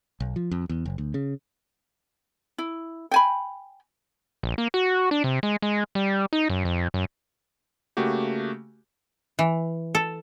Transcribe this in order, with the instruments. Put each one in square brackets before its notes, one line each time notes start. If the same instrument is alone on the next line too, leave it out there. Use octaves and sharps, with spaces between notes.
[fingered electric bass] B1
F3
F2
E2
F#1
D2
C#3
[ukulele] E4
G5 G#5 B5
[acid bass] A#1
A#3
F#4
D4
C3
G#3
G#3
G3
D#4
F#2
F2
F#2
[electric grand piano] C#3 A3 A#3 F#4 G4
[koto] E3
A4